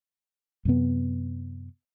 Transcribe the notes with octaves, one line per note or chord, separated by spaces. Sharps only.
F#2 C3 B3